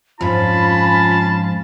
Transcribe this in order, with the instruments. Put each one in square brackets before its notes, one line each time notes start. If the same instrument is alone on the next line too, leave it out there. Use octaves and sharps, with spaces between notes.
[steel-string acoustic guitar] F2 G#2 [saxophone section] C#4 F4 [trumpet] A5 [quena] B5